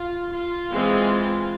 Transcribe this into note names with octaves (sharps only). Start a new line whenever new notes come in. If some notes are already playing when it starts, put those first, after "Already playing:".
Already playing: F4
F4
E3 G#3 C4